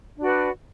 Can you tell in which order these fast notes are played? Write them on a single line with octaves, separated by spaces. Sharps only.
D4 D5 F#4 B4